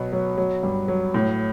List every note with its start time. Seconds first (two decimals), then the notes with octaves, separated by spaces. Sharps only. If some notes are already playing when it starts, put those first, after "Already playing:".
Already playing: B2 F#3 B3
0.13 F#3
0.38 F#3
0.63 G2
0.88 F#3
1.14 A2